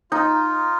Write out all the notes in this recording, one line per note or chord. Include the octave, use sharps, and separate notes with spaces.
D#4 F4